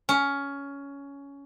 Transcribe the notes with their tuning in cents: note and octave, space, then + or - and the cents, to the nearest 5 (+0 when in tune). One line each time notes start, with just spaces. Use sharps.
C#4 +15